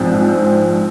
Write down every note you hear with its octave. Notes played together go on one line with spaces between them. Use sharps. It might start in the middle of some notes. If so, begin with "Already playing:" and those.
Already playing: A#1 G#2 F3 C4